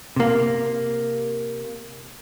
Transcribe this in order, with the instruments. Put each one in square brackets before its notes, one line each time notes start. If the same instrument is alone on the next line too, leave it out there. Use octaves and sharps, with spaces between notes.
[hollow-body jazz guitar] C3 A#3